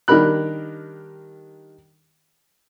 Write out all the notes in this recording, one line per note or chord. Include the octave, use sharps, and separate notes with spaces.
D#3 G3 D4 A#4 B5 F#6